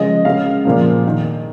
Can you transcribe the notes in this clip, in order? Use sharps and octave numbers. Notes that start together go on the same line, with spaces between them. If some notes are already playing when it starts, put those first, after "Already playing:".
Already playing: C#3 F3 G#3 D#5
C#3 G#3 F5
A#2 F3 A#3
D#3 A#3